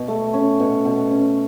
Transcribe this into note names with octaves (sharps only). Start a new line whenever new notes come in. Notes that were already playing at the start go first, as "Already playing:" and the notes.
Already playing: B2
A3
C#4
B2
B2
C#4